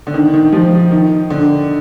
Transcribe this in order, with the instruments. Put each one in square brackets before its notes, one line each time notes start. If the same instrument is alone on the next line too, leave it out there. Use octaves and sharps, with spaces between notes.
[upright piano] D3
D#3
D#3
F3
D#3
D3